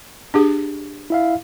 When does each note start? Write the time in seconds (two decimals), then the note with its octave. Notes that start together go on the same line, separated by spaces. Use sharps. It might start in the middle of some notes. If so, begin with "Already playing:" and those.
0.34 D4 G4 G#4
1.10 E4 E5 F5